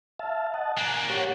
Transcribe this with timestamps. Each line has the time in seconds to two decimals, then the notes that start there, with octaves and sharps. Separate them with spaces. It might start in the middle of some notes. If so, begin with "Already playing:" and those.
0.19 E5 F5 A5
0.54 D#5 F#5 A5
0.77 A#3 D4 G#5 F#6
1.09 G4 C#5 F#5